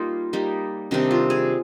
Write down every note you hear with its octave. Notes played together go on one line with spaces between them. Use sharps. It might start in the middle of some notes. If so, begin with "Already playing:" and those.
Already playing: G3 A#3 D#4 F4
G3 A#3 D#4
C3 D#3 G3 D4 D#4
F4
G#4